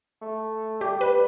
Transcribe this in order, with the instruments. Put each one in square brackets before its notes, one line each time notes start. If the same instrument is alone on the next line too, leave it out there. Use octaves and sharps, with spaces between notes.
[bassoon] A3
[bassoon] G3 [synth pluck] G4
[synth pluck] B4